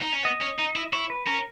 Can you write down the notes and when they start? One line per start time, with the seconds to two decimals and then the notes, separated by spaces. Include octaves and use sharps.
0.02 D#4
0.14 C#4
0.25 B3 D#5
0.42 C#4
0.59 D#4
0.76 E4
0.93 E4 C#5
1.10 B4
1.27 C#4 A#4